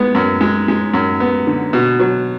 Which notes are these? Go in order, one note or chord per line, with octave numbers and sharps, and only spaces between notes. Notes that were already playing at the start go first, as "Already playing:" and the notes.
Already playing: G#3 B3
F#2
G#3
G#3
F#2
B3
D3
B2
F#3